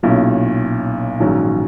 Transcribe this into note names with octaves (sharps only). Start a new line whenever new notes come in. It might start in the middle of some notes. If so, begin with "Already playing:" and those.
B1 A#2 F#3 C#4 E4
A#1 G#2 D#3 F#3 C#4